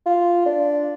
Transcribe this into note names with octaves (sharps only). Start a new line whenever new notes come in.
F4
D4